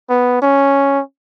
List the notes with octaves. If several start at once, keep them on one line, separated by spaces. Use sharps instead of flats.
B3
C#4